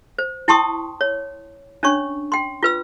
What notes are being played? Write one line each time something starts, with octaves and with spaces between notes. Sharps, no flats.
C5
E4 G5 A5 C6 C#6 D#6
C#5
C#4 D4 C#5 C#6
G5 C6
F4 B4 E6